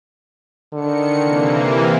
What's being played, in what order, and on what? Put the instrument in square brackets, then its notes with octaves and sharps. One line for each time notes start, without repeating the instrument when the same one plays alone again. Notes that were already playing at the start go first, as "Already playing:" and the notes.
[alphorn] D3 [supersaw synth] D#3 C#7
[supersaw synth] C3 E3 A#3